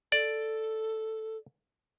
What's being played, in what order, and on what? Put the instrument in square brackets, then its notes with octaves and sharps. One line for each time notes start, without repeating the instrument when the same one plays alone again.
[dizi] A4 [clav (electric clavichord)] D5